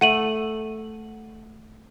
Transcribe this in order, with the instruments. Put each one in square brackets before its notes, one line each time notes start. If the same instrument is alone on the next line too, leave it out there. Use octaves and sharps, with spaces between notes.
[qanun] A3 [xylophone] F#5 D#7 F#7